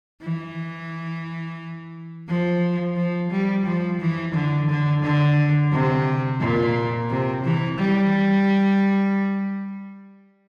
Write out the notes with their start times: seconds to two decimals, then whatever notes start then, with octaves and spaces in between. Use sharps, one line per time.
0.21 E3
2.28 F3
2.96 F3
3.31 G3
3.66 F3
4.00 E3
4.34 D3
4.69 D3
5.03 D3
5.72 C3
6.40 A#2
7.09 C3
7.44 E3
7.78 G3